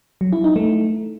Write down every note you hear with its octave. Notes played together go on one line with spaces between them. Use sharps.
F#3
E4
D#4
A3